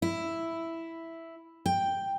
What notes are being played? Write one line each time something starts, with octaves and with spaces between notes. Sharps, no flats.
E4
G5